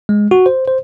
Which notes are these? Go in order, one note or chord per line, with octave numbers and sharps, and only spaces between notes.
G#3
F#4
C5
C5